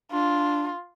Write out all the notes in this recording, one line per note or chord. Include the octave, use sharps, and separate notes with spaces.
D4 F4